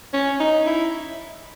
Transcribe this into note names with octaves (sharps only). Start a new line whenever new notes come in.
C#4
D#4
E4